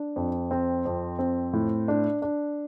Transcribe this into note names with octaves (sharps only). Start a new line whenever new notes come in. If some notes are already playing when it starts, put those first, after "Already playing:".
Already playing: D4
F2
C4
F2
C4
A2
D4
D4